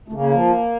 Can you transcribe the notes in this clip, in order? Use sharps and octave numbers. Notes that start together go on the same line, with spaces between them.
A3
C#3 A#3
F3